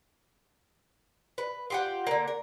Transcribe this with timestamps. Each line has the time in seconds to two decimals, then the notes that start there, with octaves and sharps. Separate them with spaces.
1.38 B4
1.70 F4 G4 F#5
2.07 D3 A#3
2.28 A#4